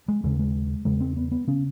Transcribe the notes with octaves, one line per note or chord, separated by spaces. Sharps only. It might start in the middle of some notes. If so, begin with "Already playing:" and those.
G#3
D#2 C#3 G#3
G#3
E2 C#3 G#3
C4
B3
B3
C#3 C#4